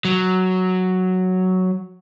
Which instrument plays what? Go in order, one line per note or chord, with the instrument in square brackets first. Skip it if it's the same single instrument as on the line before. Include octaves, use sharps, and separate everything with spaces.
[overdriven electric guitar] F#3